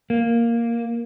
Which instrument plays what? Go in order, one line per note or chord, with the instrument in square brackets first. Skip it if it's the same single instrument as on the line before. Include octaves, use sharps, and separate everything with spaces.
[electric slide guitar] A#3